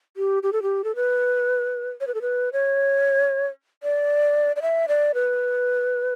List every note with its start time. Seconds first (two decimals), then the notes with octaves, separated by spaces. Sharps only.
0.17 G4
0.43 G4
0.53 A4
0.62 G4
0.84 A4
0.96 B4
2.00 C#5
2.07 B4
2.14 A4
2.21 B4
2.53 C#5
3.83 D5
4.56 D5
4.62 E5
4.88 D5
5.14 B4